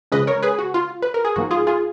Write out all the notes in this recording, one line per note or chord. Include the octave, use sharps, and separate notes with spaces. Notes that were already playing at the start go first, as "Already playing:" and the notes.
C#3 F3 G#3 C#4 B4 D#5
A#4 C#5
G#4 B4
F#4
F4
B4
A#4
G#4
G#2 F3 A#3 D#4 F#4
F4 G#4
F4 G#4